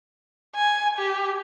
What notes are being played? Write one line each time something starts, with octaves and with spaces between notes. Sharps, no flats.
G#5
G4